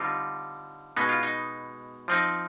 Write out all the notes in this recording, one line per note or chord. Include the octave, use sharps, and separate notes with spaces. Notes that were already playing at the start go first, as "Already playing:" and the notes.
Already playing: D3 G3 C4 D#4 F4
B2 G#3 B3 D#4
F4
D#4
F3 C4 D#4